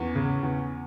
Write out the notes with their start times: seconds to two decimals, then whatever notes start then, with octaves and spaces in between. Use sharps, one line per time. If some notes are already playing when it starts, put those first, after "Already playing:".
Already playing: E2 C#4
0.15 C#3
0.43 E2